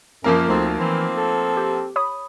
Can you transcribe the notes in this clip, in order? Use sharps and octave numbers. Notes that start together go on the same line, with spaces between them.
F#2 F3 A#3 A#4
D2 A3 C4 D#4
E3 C4
A4
G4
C#5 B5 D#6